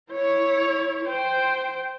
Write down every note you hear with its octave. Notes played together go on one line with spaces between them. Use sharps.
E4 C#5
C5 G5